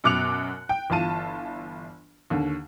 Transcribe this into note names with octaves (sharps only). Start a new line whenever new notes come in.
F#2 B2 D6 F#6 C#7 F7
G5
G1 E3 F4 A5 D#7
D#2 D3